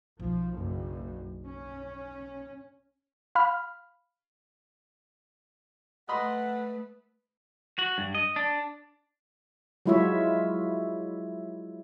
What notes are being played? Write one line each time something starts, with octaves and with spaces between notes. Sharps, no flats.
B1 F3
F#1 F#2
C#4
F5 B5 F6
A3 B4 D#5 F#5 B5 C6
F#4
G2
D#5
D4
F#3 G#3 E4 F4 C#5 E5